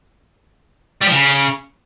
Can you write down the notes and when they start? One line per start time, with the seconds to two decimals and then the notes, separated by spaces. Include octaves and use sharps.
1.01 G3
1.07 F3
1.12 C#3